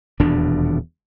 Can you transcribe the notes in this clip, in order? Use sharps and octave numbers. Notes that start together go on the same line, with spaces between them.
D#1 E2 B2 D4